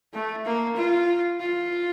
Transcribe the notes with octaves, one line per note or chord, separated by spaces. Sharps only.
A3
A#3
F4
F4